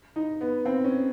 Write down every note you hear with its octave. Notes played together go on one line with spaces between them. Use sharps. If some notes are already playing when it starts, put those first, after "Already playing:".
D#4
B3
C4
C#4